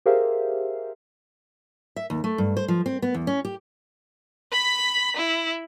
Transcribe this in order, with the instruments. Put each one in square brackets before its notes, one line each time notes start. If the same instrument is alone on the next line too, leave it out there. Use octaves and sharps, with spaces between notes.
[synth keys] G4 G#4 A#4 C5 E5 F5
[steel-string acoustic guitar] E5
D#2
A3
G2
C5
F3
C4
B3
E2
C#4
G4
[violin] B5 B6
E4